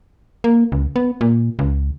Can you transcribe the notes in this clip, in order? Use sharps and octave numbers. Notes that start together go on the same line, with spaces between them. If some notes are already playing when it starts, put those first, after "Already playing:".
A#3
C#2
B3
A#2
C#2